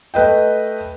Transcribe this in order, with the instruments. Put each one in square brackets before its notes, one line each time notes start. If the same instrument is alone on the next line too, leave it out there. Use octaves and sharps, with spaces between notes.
[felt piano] A3 B4 D#5 G5